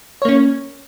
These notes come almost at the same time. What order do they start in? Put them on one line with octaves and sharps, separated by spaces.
C#5 A#3 C#4